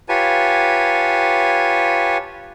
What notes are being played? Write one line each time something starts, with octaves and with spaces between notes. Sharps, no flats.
F4 G4 B4 C#5 G#5 A5